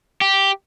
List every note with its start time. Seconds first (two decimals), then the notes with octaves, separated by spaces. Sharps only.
0.21 G4